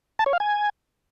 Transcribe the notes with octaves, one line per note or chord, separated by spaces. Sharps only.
A5
C#5
F5
G#5